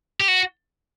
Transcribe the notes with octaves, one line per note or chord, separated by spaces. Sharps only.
G4
F#4